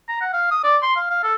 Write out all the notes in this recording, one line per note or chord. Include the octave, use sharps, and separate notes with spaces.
A#5
F#5
F5
D#6
D5
C6
F5
F5
A4